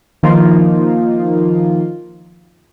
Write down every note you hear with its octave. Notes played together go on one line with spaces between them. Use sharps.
D#3 F3 A#3 D#4 F4